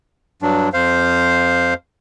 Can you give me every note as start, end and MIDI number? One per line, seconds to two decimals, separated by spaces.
0.42 0.69 43
0.42 0.69 54
0.42 0.69 62
0.73 1.74 41
0.73 1.74 72
0.73 1.74 77